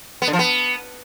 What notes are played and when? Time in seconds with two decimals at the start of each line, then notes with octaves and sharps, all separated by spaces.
0.22 B3
0.28 D3
0.33 F3
0.39 B3